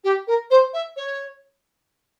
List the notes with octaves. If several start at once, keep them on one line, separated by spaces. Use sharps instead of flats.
G4
A#4
C5
E5
C#5